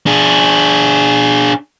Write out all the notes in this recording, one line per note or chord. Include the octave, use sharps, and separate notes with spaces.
D4 G#4